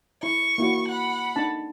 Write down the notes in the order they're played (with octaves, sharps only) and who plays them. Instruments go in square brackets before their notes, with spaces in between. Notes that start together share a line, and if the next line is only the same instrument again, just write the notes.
[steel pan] E4 [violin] C#6
[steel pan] A#3 E4 F#4
[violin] F#5 B5
[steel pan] D4 D#4 A5